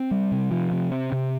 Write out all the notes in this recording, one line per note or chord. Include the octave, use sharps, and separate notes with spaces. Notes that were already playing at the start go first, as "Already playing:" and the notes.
Already playing: C4
G3
C3
F3
C3
C4
C3